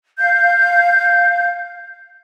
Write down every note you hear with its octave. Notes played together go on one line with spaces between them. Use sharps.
F5 G6